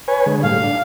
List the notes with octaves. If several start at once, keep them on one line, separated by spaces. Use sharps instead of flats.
B4 C#5 G#5
D3 G#3
A2 G3 F5
D4